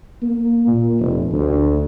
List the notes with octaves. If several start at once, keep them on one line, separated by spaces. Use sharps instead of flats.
A#3
A#2
F1
D2